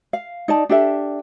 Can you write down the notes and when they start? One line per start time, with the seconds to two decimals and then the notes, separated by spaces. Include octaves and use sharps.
0.13 F5
0.48 D#4 D5 A5
0.69 D4 G4 A4 E5